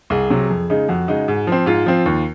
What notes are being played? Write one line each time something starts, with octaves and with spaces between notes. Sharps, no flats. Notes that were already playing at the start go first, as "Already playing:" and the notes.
C2 G#4
C3 F#3
F2
C#3 G#3 D#4
F2 F#4
C#3 G#3 D#4
G#2
F3 C4
G#2 F4
F3 C4
D#2